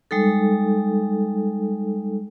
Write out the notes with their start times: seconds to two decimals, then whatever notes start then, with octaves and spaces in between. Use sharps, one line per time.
0.11 G3 G#3 D#4 A4